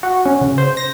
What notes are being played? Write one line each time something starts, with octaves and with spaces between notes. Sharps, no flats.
F#4
C#4
C#3
C5
A#6